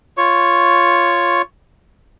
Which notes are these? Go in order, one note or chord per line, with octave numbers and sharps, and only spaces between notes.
F4 C#5 C#6